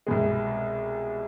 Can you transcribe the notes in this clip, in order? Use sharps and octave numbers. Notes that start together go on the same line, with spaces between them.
C2 B2 G#3